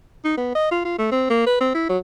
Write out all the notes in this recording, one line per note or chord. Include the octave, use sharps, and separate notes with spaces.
D#4
B3
D#5
F4
F4
A3
C4
A#3
B4
C4
E4
F#3